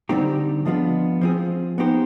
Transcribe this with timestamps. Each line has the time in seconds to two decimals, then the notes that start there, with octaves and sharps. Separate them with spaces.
0.09 D3 G3 C4 D#4 G4
0.65 F3 G#3 B3 D4 F4
1.21 F3 C4 F4 G#4
1.78 B3 D#4 G4 C5